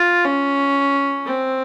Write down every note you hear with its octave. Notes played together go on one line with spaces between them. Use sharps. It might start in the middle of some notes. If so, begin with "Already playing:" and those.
Already playing: F4
C#4
C4